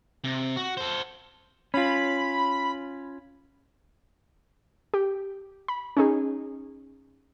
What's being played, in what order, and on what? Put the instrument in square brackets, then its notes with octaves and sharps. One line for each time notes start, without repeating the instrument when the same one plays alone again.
[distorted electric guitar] C3
F#4
A4 C5
[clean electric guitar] C#4 F4 [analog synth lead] B5
[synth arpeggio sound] G4
B5
C#4 D#4 G#4